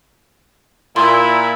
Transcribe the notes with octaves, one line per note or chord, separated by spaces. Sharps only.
A#2 E4 C6